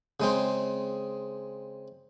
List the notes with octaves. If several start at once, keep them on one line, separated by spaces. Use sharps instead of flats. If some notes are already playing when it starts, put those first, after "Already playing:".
C#3 G#3 C4